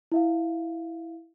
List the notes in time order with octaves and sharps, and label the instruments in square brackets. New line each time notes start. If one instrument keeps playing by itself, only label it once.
[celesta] E4 E5 F5